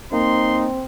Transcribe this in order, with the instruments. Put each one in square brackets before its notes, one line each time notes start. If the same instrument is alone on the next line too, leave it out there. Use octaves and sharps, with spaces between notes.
[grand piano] A#3 [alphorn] C4 [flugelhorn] D#4 [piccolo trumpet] C6